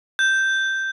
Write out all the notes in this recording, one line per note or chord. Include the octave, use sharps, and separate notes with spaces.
G6